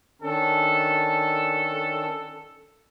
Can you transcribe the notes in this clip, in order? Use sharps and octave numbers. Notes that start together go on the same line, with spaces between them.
D#3 C#4 D4 A4